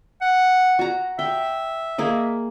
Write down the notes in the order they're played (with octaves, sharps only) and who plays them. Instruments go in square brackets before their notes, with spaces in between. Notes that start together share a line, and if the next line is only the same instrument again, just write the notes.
[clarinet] F#5
[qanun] F#4 A#5
[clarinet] E5 [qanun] G5
[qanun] A#3 G#4 D#5